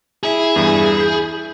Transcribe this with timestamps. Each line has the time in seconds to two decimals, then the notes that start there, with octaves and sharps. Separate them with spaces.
0.23 E4 G#4
0.56 E2 G2
1.00 G6